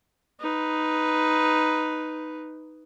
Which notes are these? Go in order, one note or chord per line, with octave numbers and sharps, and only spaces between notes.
D#4 B4